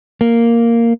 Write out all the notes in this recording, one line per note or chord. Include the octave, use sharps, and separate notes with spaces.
A#3